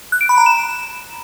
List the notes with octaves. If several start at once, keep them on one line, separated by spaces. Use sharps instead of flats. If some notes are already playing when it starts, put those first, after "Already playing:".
F#6
D7
B5
A#5
E7